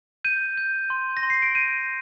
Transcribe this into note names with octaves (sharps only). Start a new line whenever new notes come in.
G6 D#7
G6
C6
A#6
C6
C7
D7
G6 D#7